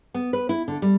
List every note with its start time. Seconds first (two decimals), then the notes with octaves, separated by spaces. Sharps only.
0.14 B3
0.33 B4
0.49 E4
0.68 D3
0.82 G3